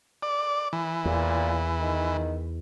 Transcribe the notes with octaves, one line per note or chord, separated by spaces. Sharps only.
D5
E3
E2 A#2
D#3